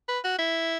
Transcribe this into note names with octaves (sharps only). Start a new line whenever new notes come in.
B4
F#4
E4